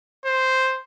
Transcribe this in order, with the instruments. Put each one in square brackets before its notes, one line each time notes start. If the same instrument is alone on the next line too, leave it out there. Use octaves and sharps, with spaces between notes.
[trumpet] C5